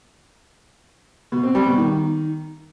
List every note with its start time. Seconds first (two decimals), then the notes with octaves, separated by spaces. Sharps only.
1.32 B2
1.43 C4
1.55 G3
1.66 B2
1.78 D#3